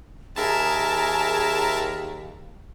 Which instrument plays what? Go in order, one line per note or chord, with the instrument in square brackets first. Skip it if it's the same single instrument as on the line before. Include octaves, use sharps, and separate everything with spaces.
[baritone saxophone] D#2 [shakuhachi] G#4 [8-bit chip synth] A#4 E5 A5